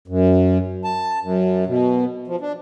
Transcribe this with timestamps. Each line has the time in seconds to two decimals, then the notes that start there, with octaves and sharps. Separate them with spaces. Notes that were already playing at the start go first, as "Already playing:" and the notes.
0.08 F#2
0.84 A5
1.22 F#2
1.67 B2
2.27 F3
2.41 D4